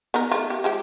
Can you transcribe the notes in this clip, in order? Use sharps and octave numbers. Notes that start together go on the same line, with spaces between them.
B3 D#4 A#4
A3 F4
G4
F3 G#3 G4